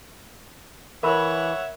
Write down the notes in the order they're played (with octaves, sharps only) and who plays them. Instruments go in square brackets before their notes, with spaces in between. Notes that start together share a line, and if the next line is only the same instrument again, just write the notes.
[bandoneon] E3 [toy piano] A#4 B5 [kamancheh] C#5 F#5 [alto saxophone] E5